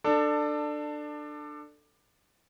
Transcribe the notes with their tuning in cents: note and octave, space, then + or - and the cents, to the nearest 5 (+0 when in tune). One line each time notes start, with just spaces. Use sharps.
D4 +20 A4 +15